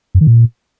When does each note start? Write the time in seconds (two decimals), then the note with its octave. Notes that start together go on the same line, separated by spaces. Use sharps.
0.15 F#2
0.21 D#3
0.27 A#2